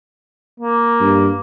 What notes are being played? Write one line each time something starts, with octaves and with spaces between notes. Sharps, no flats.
A#3
G2